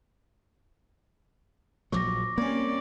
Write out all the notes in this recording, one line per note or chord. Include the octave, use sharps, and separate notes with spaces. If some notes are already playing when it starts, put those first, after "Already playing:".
A#1 F3 F#3 C#6 D6 A#6
G3 A#3 C4 C#4 D5